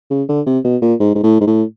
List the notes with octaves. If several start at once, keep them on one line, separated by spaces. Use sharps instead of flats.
C#3
D3
C3
B2
A#2
G#2
G#2
A2
G#2
A2